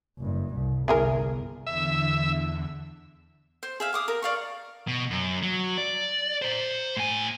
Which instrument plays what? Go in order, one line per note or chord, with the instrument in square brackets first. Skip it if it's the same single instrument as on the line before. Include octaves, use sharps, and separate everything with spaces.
[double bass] F#1 G2
C2
[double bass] G1 C2 [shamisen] E3 G#4 A#4
[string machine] E2 D3 [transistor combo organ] E5
[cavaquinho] C5
G#4 E5 F5
F5 D6 D#6
A#4
D5 F5 C#6
[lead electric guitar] B2
F#2
F#3
D5
C5 A#5
A2 G#5